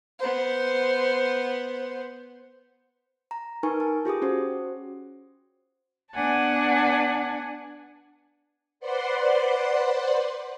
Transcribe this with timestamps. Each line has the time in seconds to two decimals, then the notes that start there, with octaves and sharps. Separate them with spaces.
0.19 B3 C5
3.31 A#5
3.63 D#4 A#4 B4 G#5 C#6
3.80 A5
4.05 F4 G4 G#4 D#6
4.22 C#4 F#4 C5
6.13 B3 D4 F#5 G#5 A5
8.80 B4 C5 D5 F#5 C6